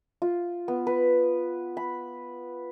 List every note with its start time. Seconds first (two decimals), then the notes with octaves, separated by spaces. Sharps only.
0.22 F4
0.68 B3
0.87 B4
1.77 B5